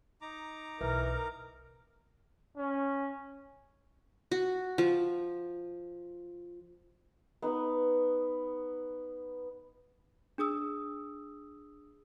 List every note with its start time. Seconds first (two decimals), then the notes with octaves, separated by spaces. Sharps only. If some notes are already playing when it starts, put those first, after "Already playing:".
0.21 D#4 A#5 D6
0.81 B1 E3 A#4
2.57 C#4
4.31 F#4
4.78 F3
7.42 B3 D#4 B4
10.38 D4 G#4 D#6 E6